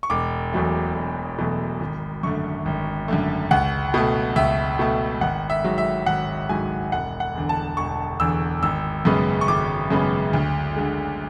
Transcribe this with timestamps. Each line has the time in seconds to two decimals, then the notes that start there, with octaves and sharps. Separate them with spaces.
0.03 C#6
0.10 E1 D6
0.53 E2 B2 F#3 A3
0.95 E1
1.38 E2 B2 F#3 A3
1.80 G#1
2.23 F#2 D3 A3 C#6
2.66 G#1
3.08 F#2 D3 A3
3.51 C#2 F#5
3.94 B2 A3
4.36 C#2 E5
4.79 B2 A3
5.21 G#1 F#5
5.50 E5
5.64 G#2 F#3
5.78 E5
6.06 G#1 F#5
6.49 G#2 F#3 G#5
6.92 E1 F#5
7.20 F#5
7.35 E2 D3
7.49 A5
7.77 E1 C#6
8.20 E2 D3 E6
8.63 G#1 E6
9.05 F#2 C#3 G#3 B3
9.41 C#6
9.48 G#1 D6
9.90 F#2 C#3 G#3 B3
10.33 D2
10.76 D3 G#3